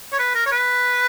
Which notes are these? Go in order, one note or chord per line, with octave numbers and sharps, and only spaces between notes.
C#5
B4
A#4
C#5
B4